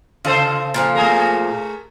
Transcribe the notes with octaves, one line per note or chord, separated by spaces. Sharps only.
C#3 F4 A4 C5
A#2 D3 F3
A3 G#4 A#4